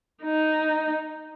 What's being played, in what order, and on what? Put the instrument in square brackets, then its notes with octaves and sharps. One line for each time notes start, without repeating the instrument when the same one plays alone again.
[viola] D#4